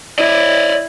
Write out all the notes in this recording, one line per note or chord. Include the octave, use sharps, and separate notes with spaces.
E4 D5 D#5